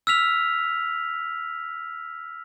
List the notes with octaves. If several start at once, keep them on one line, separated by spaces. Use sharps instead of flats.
E6 F6 B6 F7